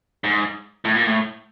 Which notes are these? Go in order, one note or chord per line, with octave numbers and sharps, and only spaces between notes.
G#2
A2
A#2
A2